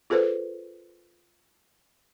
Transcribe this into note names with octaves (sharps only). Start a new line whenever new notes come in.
F4 G#4 A4 B4 C5